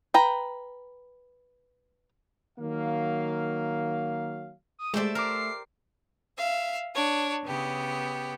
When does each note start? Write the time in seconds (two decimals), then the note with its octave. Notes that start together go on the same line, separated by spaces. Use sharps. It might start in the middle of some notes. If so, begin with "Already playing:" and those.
0.14 B4 G5 A#5
2.59 D#3 F#3 A#3 F5
4.79 D#6
4.94 G#3 A3 G4 C5 D5 E5
5.15 A#4 D6 F6 C7
6.38 E5 F5
6.94 D4 C#5
7.44 C#3 B3 G4